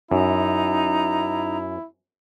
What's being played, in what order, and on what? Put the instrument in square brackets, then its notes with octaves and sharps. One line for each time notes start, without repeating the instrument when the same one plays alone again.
[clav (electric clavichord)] F#2 [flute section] D#4 A#5 [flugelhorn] E4